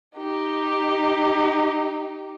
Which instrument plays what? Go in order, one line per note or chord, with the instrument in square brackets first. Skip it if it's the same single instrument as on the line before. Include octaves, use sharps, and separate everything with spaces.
[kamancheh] D#4 G4